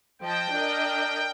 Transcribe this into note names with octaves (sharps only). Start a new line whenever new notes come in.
F3 D#5 G5 A5
D4 A#4 D#5